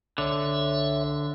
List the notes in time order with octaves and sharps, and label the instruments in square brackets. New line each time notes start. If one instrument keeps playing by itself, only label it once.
[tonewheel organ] C2 C#5 E5 [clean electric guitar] D3